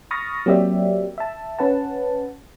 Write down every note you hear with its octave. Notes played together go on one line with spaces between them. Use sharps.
B5 C#6 D#6 F6 A6 A#6
F#3 A#3 C4 G4 D5 E5
E5 A5
C#4 B4 F#5 A5